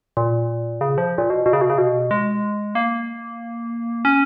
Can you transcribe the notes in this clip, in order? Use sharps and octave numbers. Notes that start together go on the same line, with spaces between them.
A#2
C#3
F3
A#2
B2
B2
C#3
B2
C#3
B2
G#3
A#3
C#4